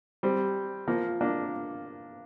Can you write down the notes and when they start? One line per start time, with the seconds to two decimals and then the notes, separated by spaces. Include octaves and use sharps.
0.23 G3 C4
0.88 F3 A#3
1.21 A#3 D4